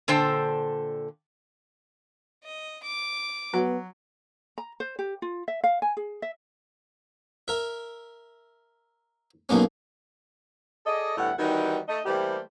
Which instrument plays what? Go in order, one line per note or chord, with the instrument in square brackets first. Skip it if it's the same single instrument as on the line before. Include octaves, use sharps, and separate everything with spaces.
[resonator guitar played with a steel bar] A#2 D3 A4 C5 G5 A5
[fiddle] D#5
D6
[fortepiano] F#3 [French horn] B3
[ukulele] A#5
C5
G4
F4
E5
F5
G#5
G#4
E5
[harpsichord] A#4 E5
B1 B2 A#3 C#4
[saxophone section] G#4 A4 D5 D#5
D2 A2 G3 B3 E4 F#5
D#3 E3 G3 C4 D#4 F#4
A3 D#4 D#5
E3 G3 A3 A#3 G4 C5